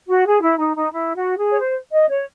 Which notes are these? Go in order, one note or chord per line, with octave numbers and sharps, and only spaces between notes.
F#4
G#4
E4
D#4
D#4
E4
F#4
G#4
C#5
C5
D#5
C#5